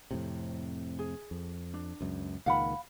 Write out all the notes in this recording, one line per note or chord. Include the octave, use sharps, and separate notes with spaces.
F2 A2 C3
G#4
F2
D4
C#2 F#2
C#2 A#2 D#3 F5 F#5 B5